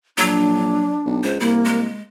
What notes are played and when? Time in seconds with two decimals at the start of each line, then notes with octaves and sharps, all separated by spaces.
0.18 A#1 F#3 D4
1.05 B1
1.24 C#2 C5
1.40 C2 A#3 E4
1.65 G#3